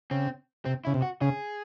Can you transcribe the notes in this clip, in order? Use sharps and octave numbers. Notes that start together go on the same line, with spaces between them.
C#3 C4
C3 C4
C#3 E4
C3
F#4
C#3 G#4